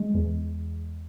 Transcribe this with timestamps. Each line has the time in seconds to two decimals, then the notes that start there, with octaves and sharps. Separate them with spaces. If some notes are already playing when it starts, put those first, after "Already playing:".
Already playing: G#3
0.14 E2